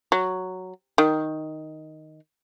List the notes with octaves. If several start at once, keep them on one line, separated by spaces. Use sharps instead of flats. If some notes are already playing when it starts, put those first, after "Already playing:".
F#3
D#3